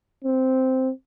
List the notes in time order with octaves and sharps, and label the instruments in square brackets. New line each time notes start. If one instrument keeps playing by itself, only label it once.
[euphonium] C4